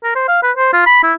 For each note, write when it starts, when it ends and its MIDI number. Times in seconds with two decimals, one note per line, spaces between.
0.04 0.15 70
0.16 0.24 72
0.28 0.43 77
0.43 0.52 71
0.57 0.70 72
0.73 0.86 65
0.86 1.02 83
1.03 1.13 64